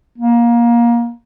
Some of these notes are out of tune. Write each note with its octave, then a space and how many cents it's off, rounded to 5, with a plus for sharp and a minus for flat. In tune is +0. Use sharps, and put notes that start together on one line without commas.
A#3 +20